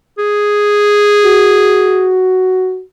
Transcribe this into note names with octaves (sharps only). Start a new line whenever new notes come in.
G#4
F#4